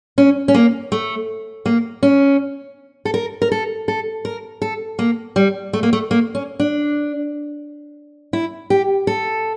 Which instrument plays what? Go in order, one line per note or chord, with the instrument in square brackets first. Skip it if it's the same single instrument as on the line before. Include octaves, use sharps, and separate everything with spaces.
[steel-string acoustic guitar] C#4
C#4
A#3
A3
A#3
C#4
A4
A#4
A#4
A4
A4
A#4
A4
A#3
G3
A3
A#3
A3
A#3
C#4
D4
E4
G4
A4